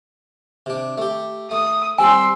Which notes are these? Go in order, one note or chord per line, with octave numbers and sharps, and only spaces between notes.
C3 D4
A3 G4
A3 D#6
G3 C4 G#5 C6 E6